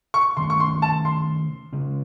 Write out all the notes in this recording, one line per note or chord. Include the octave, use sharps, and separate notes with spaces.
C#6
C3 D#3 A3 C#4 C6
C#6
C6
A5
C6
C#3 G#3 C#4